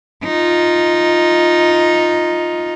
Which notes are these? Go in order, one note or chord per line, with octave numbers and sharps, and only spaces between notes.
D#4 F4